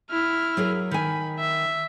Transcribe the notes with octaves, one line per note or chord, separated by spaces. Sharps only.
E4 F6
F#3 G#4 A#4
D#3 G#5 B5
E5